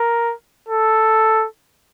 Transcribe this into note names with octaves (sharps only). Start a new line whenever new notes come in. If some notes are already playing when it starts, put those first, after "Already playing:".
Already playing: A#4
A4